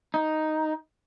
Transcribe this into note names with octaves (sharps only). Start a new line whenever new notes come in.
D#4